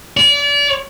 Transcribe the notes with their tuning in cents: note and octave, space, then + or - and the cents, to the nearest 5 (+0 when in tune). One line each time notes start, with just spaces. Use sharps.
D5 -35